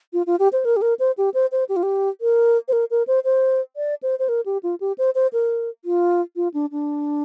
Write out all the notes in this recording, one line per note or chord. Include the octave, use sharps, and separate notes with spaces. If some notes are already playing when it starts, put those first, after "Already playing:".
F4
F4
G4
C5
A#4
G4
A#4
C5
G4
C5
C5
G4
F4
G4
A#4
C5
A#4
A#4
C5
C5
D5
C5
C5
A#4
G4
F4
G4
C5
C5
A#4
F4
F4
D4
D4